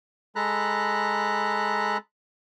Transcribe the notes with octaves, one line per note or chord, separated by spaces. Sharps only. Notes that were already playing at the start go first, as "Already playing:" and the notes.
G#3 A4 A#5 B5 F#6